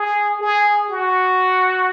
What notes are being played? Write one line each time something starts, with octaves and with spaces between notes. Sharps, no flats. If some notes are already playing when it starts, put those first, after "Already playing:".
Already playing: G#4
G#4
F#4